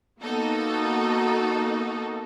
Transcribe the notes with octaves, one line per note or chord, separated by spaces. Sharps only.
A#3 B3 D#4 F#4 A4